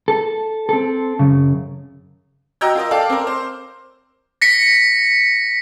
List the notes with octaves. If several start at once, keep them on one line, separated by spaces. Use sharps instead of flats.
A4
C4 A4
F#2 C#3
F#4 D#5 G5 A#5 E6 G6
F4 A#4 D#5
A4 D5 F5 G5 D6 F6
C4 A#4
C5
A#6 B6 C#7